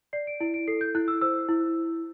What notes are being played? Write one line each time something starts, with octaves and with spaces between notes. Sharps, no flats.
D5 C7
D7
E4 D7
D7
A4 C7
G6
E4 F#6
E6
C5 E6
E4